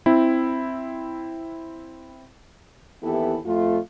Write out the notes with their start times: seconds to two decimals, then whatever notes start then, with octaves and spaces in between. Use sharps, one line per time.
0.06 C4 E4
3.03 D#2 E3 B3 E4 G4 A4
3.45 F2 A3 F4